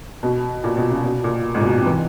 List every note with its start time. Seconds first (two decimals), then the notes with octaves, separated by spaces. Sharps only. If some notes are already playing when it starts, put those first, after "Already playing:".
0.23 B2
0.64 A#2
0.77 B2
0.90 C#3
1.04 B2
1.24 A#2
1.55 G#2
1.60 A#2
1.65 B2
1.75 C3
1.86 E3